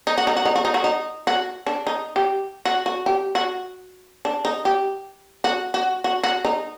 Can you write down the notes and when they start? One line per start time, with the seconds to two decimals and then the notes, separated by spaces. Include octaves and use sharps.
0.07 D#4
0.18 F#4
0.27 D#4
0.36 F#4
0.45 D#4
0.55 F#4
0.65 D#4
0.74 F#4
0.84 D#4
1.27 F#4
1.67 D4
1.87 D#4
2.16 G4
2.65 F#4
2.86 F#4
3.06 G4
3.35 F#4
4.25 D4
4.45 D#4
4.65 G4
5.44 F#4
5.74 F#4
6.04 F#4
6.24 F#4
6.45 D#4